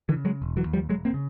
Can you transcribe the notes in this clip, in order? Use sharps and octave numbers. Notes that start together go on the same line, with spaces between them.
D3 E3
C#3
F#3 G#3
E1
E3 F#3
D#2
F3 G3
E1 F#3 G#3
A#3 C4
C#3